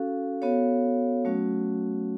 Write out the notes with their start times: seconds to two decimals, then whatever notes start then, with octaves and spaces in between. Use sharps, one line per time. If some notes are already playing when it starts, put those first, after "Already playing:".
Already playing: C#4 F#4 A4 F5
0.42 B3 F#4 A4 C#5 F5
1.25 F#3 A3 C#4 F#4